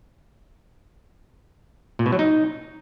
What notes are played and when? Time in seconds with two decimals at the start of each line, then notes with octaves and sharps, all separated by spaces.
1.99 A#2
2.06 B2
2.12 F#3
2.19 D#4